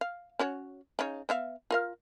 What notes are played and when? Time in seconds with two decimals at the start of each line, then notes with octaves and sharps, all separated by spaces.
0.01 F5
0.39 C#4 F#4 C#5
0.99 C#3 D#4 C#5
1.29 B3 E5 F5
1.71 F4 A#4 F5